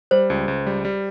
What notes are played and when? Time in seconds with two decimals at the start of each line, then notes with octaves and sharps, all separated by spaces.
0.11 G3 C5
0.30 C#2
0.48 C#2
0.67 G3
0.85 G3